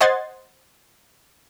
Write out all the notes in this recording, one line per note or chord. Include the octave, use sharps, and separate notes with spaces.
C5 D#5 F#5 C6 G#6 A6